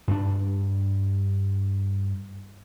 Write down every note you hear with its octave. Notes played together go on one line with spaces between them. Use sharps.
G2 D4